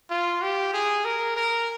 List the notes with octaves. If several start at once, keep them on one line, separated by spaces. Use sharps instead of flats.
F4
G4
G#4
A#4
A#4